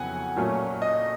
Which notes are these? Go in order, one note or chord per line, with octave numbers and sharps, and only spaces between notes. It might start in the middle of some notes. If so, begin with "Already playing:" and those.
Already playing: F2 C#3 F#3 B3 E4 F#5 G#5
A#2 F#3 A3 C#4
D#5